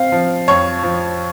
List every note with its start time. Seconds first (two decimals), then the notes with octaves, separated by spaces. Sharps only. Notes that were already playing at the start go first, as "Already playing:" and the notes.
Already playing: C4 F5
0.12 F3
0.48 F2 C#5
0.83 F3